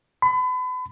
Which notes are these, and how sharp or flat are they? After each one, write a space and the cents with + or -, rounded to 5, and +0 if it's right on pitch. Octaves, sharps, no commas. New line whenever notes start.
B5 +35